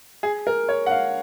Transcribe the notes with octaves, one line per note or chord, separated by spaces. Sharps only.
G#4
A#4
C#5
F#5
F5